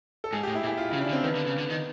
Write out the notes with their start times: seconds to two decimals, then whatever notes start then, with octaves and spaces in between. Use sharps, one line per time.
0.24 A4
0.33 G#2 G#4
0.43 A2 G4
0.55 E4
0.63 A#2
0.66 E4
0.78 F4
0.90 C#3 E4
1.01 D4
1.09 D3
1.13 C4
1.23 D#3 B3
1.36 D3
1.47 C#3
1.58 D3
1.70 D#3